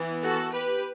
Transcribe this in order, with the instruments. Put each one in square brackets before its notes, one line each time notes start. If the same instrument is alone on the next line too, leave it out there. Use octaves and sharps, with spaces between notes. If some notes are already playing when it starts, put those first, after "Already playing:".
Already playing: [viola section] E3 B3
F#4 A4
G4 B4